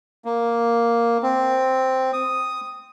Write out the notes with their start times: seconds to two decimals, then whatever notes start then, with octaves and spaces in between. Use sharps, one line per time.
0.25 A#3
1.23 C4
2.13 D#6